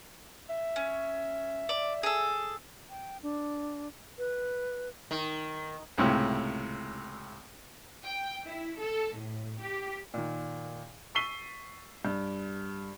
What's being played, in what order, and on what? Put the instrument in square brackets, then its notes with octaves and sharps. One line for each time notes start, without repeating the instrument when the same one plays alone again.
[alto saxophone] E5
[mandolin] C#4
D5
G#4 A4
[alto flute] G5
D4
B4
[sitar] D#3
[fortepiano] C#2 A2 C3 E4
[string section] G5
E4
A4
A2
G4
[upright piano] A#2 D#3
C#6 E6 B6 C7 D#7 G7
G2